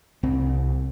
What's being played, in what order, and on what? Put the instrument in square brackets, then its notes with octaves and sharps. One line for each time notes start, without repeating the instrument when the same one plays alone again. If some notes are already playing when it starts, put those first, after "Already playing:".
[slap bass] C2 C4